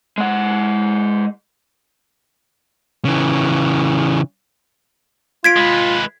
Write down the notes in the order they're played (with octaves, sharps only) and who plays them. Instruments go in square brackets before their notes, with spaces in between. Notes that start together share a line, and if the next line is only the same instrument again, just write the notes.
[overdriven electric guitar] G#3 F#5
[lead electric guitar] C#3 E3
[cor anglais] F4 [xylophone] G#6 B6 D7
[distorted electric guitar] G#3 B4